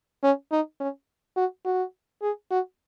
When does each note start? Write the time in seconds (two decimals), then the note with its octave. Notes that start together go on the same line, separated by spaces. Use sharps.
0.23 C#4
0.52 D#4
0.80 C#4
1.37 F#4
1.65 F#4
2.22 G#4
2.51 F#4